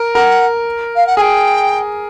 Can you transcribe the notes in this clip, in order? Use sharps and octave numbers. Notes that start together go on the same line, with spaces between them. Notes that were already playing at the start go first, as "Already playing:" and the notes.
Already playing: A#4
A#4 F#5
F5
F#5
G#4 G5 G#5